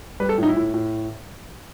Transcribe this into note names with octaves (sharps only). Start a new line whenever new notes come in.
G3 B4
A4
A2 D#4
E4
A2
A2